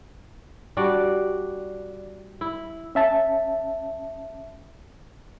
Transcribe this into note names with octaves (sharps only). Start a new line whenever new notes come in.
G3 D4 F#4 D5
E4
C#4 E5 A5